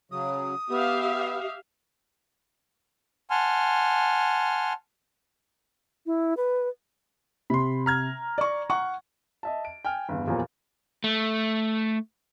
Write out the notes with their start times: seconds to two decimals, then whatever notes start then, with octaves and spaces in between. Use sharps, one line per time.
0.11 C#3 F#3 D#6
0.70 B3 G4 E5 F5
3.30 F#5 G#5 A5 C6 F6
6.06 E4
6.37 B4
7.50 C3 B5 C6
7.86 A#5 F6 G#6
8.38 D5 C#6
8.70 F#5 C#6
9.43 D#5 E5 A5
9.65 D7
9.85 G5 G#5 F6
10.09 G1 E2
10.27 D#1 E2 A#2 F3 A#4 A#5
11.04 A3